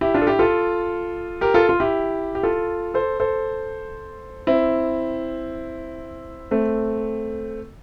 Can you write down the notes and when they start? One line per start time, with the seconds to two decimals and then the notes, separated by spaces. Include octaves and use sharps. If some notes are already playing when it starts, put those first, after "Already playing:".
0.01 E4 G4
0.14 D4 F4
0.22 A4
0.27 E4 G4
0.39 F4 A4
1.41 G4 A#4
1.54 F4 A4
1.69 F4
1.80 E4 G4
2.35 G4
2.43 F4 A4
2.94 A4 C5
3.20 A4 C5
4.47 C4 E4
6.51 A3 C4